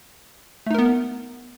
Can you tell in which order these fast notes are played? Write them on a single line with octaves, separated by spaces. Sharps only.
A3 D#4 A#4 B3